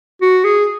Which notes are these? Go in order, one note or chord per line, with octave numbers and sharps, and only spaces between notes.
F#4
G#4